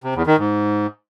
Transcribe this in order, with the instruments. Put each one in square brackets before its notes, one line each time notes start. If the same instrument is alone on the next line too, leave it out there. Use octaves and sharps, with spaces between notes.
[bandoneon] C3
E2
D#3
G#2